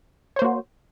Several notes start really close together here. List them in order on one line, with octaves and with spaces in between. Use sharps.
C#5 C5 A#3 F#4